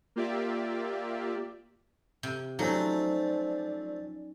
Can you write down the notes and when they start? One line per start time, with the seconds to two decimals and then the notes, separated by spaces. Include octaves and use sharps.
0.16 A#3 F4 G4 D5 E5
2.23 C3
2.59 F3 F#3 A3 C4 C#4 D#4 D5